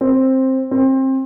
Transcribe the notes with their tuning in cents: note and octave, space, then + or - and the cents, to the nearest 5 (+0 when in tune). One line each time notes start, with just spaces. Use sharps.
C4 +10
C4 +25